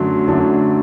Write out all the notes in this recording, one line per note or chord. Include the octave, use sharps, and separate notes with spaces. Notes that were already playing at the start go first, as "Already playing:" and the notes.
Already playing: F#2 D3 F#3 A3 D4 C6
F#2 D3 F#3 A3 D4